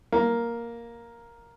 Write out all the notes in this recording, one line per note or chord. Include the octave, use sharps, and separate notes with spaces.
A#3